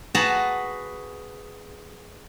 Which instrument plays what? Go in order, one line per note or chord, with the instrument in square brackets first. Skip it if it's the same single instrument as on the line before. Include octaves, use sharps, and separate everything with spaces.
[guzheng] F#4 G#4 B4 A5 A#5